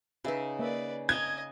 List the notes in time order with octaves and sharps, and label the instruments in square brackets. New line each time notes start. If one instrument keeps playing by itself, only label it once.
[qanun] C#3 D#4 [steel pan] B4 E5 B5
[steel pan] A#3 C#5 E5 [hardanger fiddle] B4 D5
[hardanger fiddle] D#5 [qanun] G5 A5 A#5 [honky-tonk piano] G#6